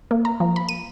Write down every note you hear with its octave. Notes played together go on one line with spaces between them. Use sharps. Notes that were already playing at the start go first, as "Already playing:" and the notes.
A#3
A#5
F3
B5
D#7